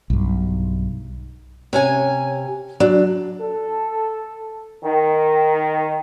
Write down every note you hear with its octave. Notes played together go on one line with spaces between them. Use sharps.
B1 G2
C3 C#4 G#5
F#3 D4
A4
D#3